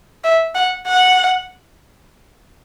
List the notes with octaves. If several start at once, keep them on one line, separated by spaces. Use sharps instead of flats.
E5
F#5
F#5